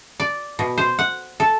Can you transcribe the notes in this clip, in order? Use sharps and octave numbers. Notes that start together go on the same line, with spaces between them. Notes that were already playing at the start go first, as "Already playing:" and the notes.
D5
B2
C5
F#5
A4